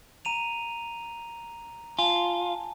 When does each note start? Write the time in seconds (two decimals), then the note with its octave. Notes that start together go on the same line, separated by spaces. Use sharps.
0.25 A#5 D#7 F7
1.99 F4 G#5 A5